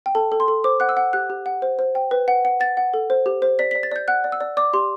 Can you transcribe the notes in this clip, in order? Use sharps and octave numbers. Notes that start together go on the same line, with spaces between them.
G5
A4 A5
A4
C6
A4
C5 D6
F#5 F#6
E6
F#5
G4 F#6
G4
F#5
C5
C5
G5
B4
F#5
F#5
F#5 A6
F#5
A4
C5
G4
C5
D5 B6
B6
D5
A6
D5 G6
F#5 F#6
D5
E6
D5
D5 D6
G4 C6